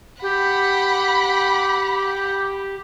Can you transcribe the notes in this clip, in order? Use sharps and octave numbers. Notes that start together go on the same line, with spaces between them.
G4 F#5 B5